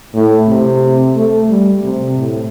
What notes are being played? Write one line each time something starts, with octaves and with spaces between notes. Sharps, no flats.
A2
C3
A3
G3
C3
A2